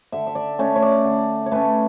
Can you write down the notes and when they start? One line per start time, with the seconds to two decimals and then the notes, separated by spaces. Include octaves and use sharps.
0.12 D3 E5
0.27 E5
0.35 D5
0.59 A3 C#4 C#5
0.76 C#5
0.82 D5
1.05 D3
1.46 C#5
1.51 A3 C#4 B4